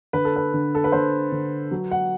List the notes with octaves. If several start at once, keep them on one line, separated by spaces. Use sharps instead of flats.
D3 B4
A4
B4
D3
A4
B4
D3 C5
D3
F#3
F#5